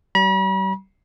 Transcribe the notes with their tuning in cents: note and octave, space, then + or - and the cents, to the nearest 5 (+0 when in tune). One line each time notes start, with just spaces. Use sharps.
G3 -40 B5 -45